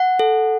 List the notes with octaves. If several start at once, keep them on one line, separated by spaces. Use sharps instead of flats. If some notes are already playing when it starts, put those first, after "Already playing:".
Already playing: F#5
A4